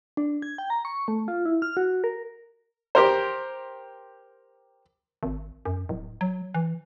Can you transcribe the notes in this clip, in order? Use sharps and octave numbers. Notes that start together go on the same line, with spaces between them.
D4
G#6
G5
A#5
C#6
A3
F4
E4
F6
F#4
A#4
G4 A#4 C5
G#1
F#2
D1
F#3
E3